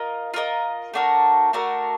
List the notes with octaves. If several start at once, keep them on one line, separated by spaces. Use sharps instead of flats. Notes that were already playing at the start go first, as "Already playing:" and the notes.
Already playing: F4 A#4 D#5
F4 A#4 D#5
A3 D4 F#4 A#4
A3 D4 F#4 A#4